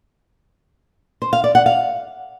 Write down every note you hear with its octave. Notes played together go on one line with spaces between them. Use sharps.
C5
F5
D5
F#5
F5